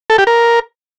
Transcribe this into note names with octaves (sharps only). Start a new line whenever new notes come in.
A4
G4
A#4